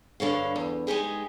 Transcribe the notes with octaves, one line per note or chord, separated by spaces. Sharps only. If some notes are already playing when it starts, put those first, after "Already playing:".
G2 D3 C#5 F5
E2
G#3 D#4 G4 G#4